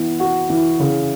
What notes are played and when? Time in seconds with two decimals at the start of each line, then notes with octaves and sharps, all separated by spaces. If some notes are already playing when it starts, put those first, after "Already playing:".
Already playing: E3 B3
0.20 F#4
0.50 E3
0.80 C#3